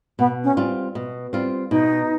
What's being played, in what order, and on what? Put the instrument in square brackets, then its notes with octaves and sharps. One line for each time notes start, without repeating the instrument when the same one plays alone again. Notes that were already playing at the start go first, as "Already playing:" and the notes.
[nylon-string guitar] B2 [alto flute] B3
[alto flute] C#4
[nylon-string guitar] G3 C4 F4
B2
G3 C4 F4
[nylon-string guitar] B2 [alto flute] D#4